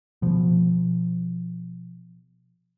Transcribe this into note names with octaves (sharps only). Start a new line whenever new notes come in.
B2 F3